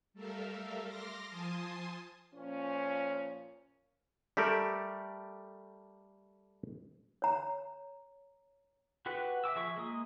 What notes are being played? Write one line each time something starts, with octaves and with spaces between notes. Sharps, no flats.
G3 A3 A4 A#4 E5 F5
C6 D6 F6 A#6
F3 G#5 A5 C6 D#6
A#2 F3 C#4
G3 A3 G4 A4 A#4 D5
C#5 A#5
F#4 G4 B4 F#5
E5 G5 D6 E6
F3 G#4 E5 C#6
G#3 A#3 D#6